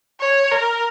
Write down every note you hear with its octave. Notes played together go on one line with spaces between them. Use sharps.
C#5
A#4